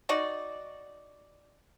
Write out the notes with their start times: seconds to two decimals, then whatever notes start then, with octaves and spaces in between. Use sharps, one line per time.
0.09 D#4 F#4 D5